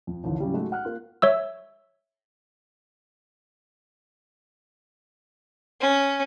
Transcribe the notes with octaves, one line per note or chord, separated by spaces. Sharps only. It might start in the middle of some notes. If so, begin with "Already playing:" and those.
F2
A1 D2 D#3 F3
A2 C#3 F#3 G3
G#3 A3 D#4 F#4
F#5 F6 F#6
A#3 F4
C#5 E5 E6
C#4